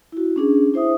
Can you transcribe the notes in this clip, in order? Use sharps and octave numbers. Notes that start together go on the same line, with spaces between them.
E4 F#4
C#4 D4 G#4
E4 C5 E5 D#6